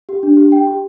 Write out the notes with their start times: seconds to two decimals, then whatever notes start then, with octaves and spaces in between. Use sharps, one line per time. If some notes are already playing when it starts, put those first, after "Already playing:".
0.09 G4
0.23 D4
0.37 G4
0.52 G5
0.67 G4